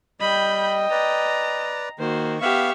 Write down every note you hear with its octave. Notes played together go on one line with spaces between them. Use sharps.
G3 D#5 G5 B5 G6
B4 D5 A#5
D#3 A#3 F#4 C5
B3 G4 E5 F5 C#6 F6